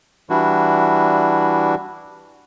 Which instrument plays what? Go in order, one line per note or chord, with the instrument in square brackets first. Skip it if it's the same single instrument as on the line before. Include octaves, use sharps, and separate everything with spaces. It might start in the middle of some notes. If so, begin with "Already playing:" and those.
[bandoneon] E3 G3 D4 E4 F#4